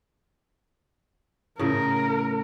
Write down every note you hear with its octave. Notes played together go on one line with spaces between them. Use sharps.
A2 C#3 A#4